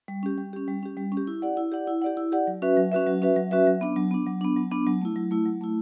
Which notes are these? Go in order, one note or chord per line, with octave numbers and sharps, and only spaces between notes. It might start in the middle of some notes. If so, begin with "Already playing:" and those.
G3
C#4 G4
G3
C#4 G4
G3
C#4 G4
G3
C#4 G4
E4
G4 D5 F#5
E4
G4 D5 F#5
E4
G4 D5 F#5
E4
G4 D5 F#5
F#3
C#4 F#4 B4 E5
F#3
C#4 F#4 B4 E5
F#3
C#4 F#4 B4 E5
F#3
C#4 F#4 B4 E5
F#3
B3 D4
F#3
B3 D4
F#3
B3 D4
F#3
B3 D4
F#3
A3 E4
F#3
A3 E4
F#3
A3 E4